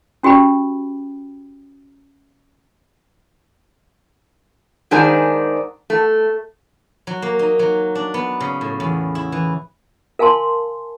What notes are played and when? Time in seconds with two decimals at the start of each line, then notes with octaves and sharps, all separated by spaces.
0.23 C#4 F#4 G4 G5 B5
4.91 G#2 D#3 D4 G#4 C5 G#5
5.90 A3
7.07 F#3
7.22 A#3
7.39 D#4
7.59 F#3
7.95 D4
8.14 B3
8.40 C#3
8.61 A2
8.80 E2
9.15 E4
9.32 E3
10.19 A#4 F5 G#5 A5 C6